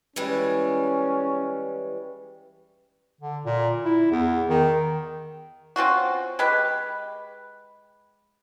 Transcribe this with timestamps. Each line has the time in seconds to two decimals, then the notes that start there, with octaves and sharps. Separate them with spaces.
0.16 E3 G3 G#3 C#4
3.21 D3
3.45 A#2
3.85 E4
4.11 E2
4.49 D#3
5.76 C4 C#4 F4 F#4
6.39 G#3 G4 B4